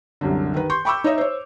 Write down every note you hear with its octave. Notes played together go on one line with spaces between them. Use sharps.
C2 F#2 D3
D#3 B4
C6 C#6 G6
G5 B5 C#6 D6 E6 G6
D#4 C#5 D#5 E5
C5 C#5